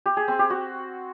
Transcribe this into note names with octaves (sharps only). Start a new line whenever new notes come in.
G4
G#4
C4
G4
F#4